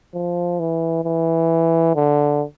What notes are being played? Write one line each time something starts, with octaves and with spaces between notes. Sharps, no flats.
F3
E3
E3
D3